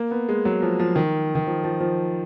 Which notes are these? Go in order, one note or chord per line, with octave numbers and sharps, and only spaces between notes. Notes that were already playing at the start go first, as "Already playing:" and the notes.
Already playing: A#3
B3
G#3
F#3
F3
F3
D#3
D#3
F3
F3
F3